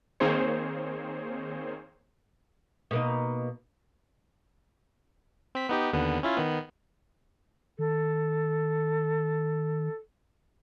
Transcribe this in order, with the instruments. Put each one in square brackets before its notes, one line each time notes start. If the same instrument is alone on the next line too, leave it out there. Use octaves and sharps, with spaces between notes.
[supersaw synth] D#3 A#3 C4 G#4 C5 C#5
[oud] B2 A#3 D#4
[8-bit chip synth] C4 B6
B3 D#4 G4
D#2 D3 B3
C#4 E4 F4
D#3 B3
[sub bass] D#3 [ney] A4